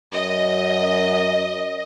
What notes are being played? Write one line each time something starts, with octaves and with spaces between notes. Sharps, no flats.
F#2 D#5